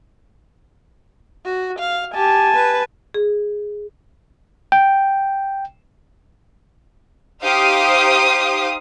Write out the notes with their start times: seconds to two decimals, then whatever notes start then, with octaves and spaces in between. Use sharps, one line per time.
1.45 F#4
1.79 F5
2.14 G4 G#5 A5
2.55 B4
3.14 G#4
4.72 G5
7.43 D#4 G4 C5 F5 D#6